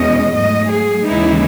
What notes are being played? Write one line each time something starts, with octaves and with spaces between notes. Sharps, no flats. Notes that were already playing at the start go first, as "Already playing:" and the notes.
Already playing: E2 B2 G#3 C#4 D#5
G#2 F#3 A3 D#5
G#4
D#2 C#3 E3 G#3 D#4 E4